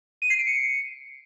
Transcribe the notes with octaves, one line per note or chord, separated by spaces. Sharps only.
D#7
C7
D7
C#7